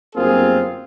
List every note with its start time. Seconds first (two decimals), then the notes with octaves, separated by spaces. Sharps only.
0.16 G1 F#2 A#3 C4 F4 G#4